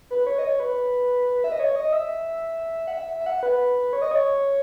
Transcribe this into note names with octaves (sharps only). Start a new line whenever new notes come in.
B4
C#5
D#5
C#5
B4
E5
D#5
C#5
D#5
E5
F#5
E5
E5
F#5
B4
C#5
D#5
C#5